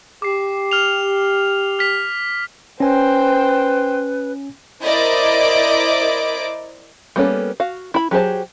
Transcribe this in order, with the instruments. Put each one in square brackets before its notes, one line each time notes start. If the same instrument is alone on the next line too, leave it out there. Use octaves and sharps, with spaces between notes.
[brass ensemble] G4 [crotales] D6 C7
[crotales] F6 F7
F6 B6 F7
[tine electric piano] C#4 G#5 [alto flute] B4 [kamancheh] C5 G5
[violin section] E4 A#4 C5 D5 D#5 D6
[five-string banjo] G3 A#3 B3 C#4 A4
F#4 F5
E4 B5
F#3 G4 G#4 C5 A5